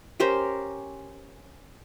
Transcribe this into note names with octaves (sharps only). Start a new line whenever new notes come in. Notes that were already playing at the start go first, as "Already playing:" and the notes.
C#4 G4 A#4 C5